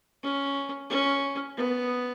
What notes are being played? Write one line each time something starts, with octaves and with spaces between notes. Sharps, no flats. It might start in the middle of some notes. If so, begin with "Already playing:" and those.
C#4
C#4
B3